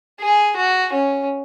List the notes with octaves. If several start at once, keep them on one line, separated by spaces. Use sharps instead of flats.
G#4
F#4
C#4